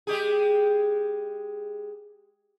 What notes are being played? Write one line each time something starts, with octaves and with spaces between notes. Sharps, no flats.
G#3 G4 G#4